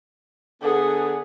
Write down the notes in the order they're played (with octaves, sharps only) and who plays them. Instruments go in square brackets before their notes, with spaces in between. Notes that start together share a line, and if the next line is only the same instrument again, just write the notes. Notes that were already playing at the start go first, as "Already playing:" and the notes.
[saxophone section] D3 B3 [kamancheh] G#4